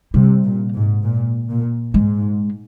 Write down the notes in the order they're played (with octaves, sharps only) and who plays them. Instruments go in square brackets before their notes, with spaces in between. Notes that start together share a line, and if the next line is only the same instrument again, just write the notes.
[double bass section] C3 [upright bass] G3
[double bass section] A#2
G#2
A#2
A#2
[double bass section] G#2 [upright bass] G#3